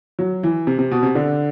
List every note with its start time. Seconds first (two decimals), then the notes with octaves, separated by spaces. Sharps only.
0.19 F#3
0.43 E3
0.67 C3
0.79 C3
0.91 B2
1.03 C3
1.15 D3